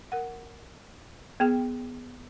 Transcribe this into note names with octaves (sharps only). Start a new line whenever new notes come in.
A#4 F#5
B3 G#4 G5